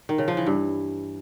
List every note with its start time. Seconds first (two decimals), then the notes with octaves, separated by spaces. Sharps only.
0.09 D#3
0.18 C#3
0.28 F3
0.37 E3
0.46 G2